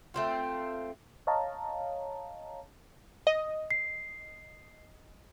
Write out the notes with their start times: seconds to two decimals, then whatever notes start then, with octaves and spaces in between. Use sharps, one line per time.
0.14 A3 C4 F4
1.27 C#5 D#5 F5 A5 A#5
3.27 D#5
3.71 C7